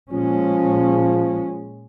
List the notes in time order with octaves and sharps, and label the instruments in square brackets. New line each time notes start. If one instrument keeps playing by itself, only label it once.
[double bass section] A#2 G#3 C#4 [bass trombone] F3